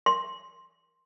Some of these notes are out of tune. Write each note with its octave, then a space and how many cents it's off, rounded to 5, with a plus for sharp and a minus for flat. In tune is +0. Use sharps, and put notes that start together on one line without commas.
C6 +5